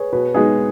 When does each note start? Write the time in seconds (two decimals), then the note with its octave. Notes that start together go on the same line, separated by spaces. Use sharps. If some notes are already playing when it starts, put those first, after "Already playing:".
Already playing: G#4 B4 C#5
0.12 B2 B4
0.34 G#3 B3 D#4 G#4